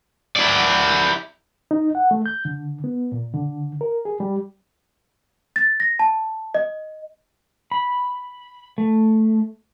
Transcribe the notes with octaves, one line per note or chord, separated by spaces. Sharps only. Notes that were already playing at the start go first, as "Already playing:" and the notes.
E4 D5
D#4
F#5
A3
G6
D3
B3
A#2
D3
A#4
G#4
G3
A6
A#6
A5
D#5
B5
A3